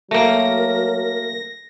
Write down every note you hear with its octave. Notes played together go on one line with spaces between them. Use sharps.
F#3 A3 A#3 A#4 A#6